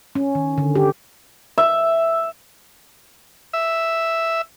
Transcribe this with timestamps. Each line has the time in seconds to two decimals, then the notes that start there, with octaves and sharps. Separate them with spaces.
0.15 C#4
0.35 D#3
0.58 D3
0.75 G4
1.58 E5
3.53 E5